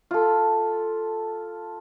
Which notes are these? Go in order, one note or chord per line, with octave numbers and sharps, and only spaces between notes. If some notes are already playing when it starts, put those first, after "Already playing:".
F4 A4